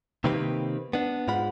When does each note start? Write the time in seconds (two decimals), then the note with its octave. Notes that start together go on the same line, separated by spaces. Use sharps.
0.24 C3 D#3 A#3 C4 G4 B4
0.93 B3 D4
1.28 G#2 G#3 F4 F#5 B5